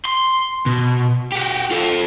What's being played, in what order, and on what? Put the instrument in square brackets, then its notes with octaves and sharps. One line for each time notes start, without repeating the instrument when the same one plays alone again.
[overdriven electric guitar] C6
B2
F#4 G4
F4 A4